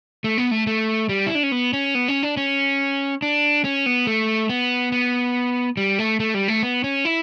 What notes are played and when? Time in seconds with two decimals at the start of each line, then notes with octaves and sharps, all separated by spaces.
0.24 A3
0.38 B3
0.51 A3
0.67 A3
1.09 G3
1.27 E4
1.35 D4
1.43 C#4
1.52 B3
1.73 C#4
1.95 B3
2.08 C#4
2.23 D4
2.37 C#4
3.22 D4
3.64 C#4
3.86 B3
4.07 A3
4.49 B3
4.92 B3
5.77 G3
5.99 A3
6.20 A3
6.34 G3
6.48 A3
6.63 B3
6.84 C#4
7.05 E4